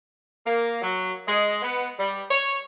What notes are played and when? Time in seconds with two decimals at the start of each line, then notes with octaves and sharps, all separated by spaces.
0.46 A#3
0.81 F#3
1.28 G#3
1.62 B3
1.98 G3
2.31 C#5